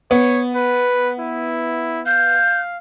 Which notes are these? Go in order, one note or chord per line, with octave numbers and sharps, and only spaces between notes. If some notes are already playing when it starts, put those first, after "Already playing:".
B3 C#5
B4
E4
F5 G6